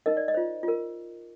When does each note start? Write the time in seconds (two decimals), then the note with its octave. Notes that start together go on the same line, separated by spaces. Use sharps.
0.06 D#4 A#4 D#5
0.17 D5
0.28 D#5
0.34 F4 C5
0.63 F4 A#4